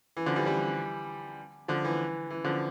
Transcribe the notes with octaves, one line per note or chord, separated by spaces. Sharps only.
E3
D3 F3
E3 G3
E3 G3
D3 F3
E3
E3
D3 F3